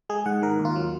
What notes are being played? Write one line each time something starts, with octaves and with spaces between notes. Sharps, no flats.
G#3 G#4
G#2 F#5
D#3 A#4
D#2
F4
F#3